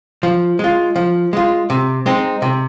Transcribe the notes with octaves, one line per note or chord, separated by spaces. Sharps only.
F3
G#3 F4
F3
G#3 F4
C3
G#3 C4 D#4
C3